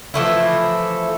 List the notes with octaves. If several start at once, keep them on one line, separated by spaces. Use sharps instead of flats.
E3 F3 A3 E4